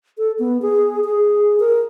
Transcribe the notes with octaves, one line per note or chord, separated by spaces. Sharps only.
A4
B3
G#4
G#4
A#4